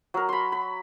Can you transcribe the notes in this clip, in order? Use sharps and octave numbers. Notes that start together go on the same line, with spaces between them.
F#3 A#4
B5 C6
B5